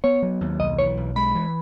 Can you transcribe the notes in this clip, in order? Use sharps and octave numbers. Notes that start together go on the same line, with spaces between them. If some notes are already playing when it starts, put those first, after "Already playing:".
B3 C#5
F#3
D#2
B1 D#5
E3 C#5
B1
G#3 B5
E3